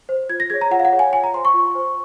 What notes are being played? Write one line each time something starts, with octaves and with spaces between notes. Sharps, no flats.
C5
F4 G#6
A#6
G#4 C#5 G#6
A#5
F4 F#5
F5
F#5
G#4 C#5
G#5
F4 G#5
A#5
C5 C6
C#6
F4
C5